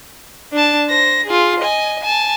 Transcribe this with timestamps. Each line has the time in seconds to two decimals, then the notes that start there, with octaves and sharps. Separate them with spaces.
0.52 D4 A5
0.89 C5 A#6
1.26 F4 G#4
1.60 D#5 G#5
2.03 G#5 A5